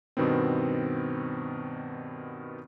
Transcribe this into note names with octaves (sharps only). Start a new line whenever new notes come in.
G2 B2 D#3 B3 C4